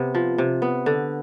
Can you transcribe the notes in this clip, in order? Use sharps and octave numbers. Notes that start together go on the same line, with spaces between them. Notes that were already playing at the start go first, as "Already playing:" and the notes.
Already playing: C3 B3
F3
C3
B3
D3